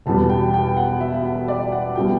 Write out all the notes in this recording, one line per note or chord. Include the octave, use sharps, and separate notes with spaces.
E1 E2 B2 G3 B3 A5
G5
G5
F#5
E5
E5
F#5
D5
F#5
B2 G3 B3 G5